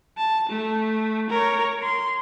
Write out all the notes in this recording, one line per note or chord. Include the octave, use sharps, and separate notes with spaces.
A5
A3
A#4 C#5
C6